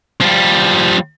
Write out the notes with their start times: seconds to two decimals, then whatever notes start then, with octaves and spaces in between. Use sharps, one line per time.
0.21 F3 G3